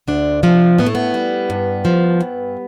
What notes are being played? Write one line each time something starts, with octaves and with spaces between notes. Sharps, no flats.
D2 D4
C3 F3 D4
A2 B3
A3
B3
G3
G2
F3
G2